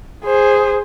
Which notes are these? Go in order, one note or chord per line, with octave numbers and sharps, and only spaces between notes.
G#4 C5